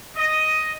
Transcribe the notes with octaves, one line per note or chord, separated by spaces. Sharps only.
D#5